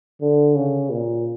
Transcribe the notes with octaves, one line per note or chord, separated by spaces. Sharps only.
D3
C#3
A#2